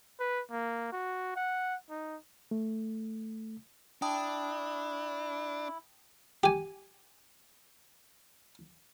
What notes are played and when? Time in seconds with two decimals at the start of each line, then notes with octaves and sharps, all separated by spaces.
0.20 B4
0.51 A#3
0.92 F#4
1.36 F#5
1.90 D#4
2.51 A3
4.02 D4 E4 G5 A5 D#6
6.44 G4 G#5